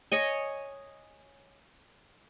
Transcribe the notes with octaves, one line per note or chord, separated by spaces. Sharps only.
C#5 D#5 G#5